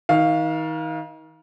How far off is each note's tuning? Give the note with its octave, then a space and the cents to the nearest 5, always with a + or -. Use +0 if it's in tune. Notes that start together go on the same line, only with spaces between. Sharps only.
D#3 +35 F5 +0